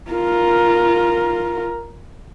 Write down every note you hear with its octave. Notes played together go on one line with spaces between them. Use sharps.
F4 A#4